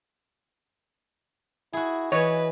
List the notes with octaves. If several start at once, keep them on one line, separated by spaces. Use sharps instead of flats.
E4 F#4 G#4
E3 B4 C#5 D#5